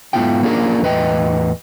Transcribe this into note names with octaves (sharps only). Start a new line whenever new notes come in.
G#2 G#3 B3 E4 F4 G5
A#3 C#4 D4 F4 G#4 A#4
E2 A2 B4 D#5 G5